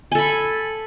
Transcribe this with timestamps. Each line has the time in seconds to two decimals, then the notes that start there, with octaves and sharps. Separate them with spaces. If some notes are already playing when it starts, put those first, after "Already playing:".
0.12 G#5
0.15 A4
0.18 B5